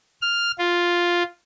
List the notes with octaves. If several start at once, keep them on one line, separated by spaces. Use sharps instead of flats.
F6
F4